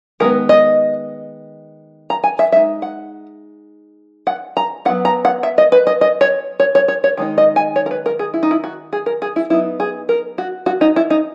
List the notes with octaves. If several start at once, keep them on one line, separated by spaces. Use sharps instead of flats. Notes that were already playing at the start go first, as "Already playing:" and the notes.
D#3 G#3 B3 A#4
D#5
A#5
G#5
E5
G#3 D#4 E5
F#5
F#5
A#5
F#3 B3 D#4 F#5
A#5
F#5
E5
D#5
B4
D#5
D#5
C#5
C#5
C#5
C#5
C#5
D#3 G#3 D#4
D#5
G#5
C#5
A#4
B4
A#4
G#4
E4
D#4
E4
F#4
G#4
A#4
G#4
E4
F#3 B3 D#4 E4
G#4
A#4
F#4
F#4
D#4
E4
D#4